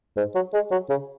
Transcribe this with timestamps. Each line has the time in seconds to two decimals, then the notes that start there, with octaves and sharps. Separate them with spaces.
0.17 G#2
0.35 F#3
0.53 G#3
0.71 F#3
0.89 C#3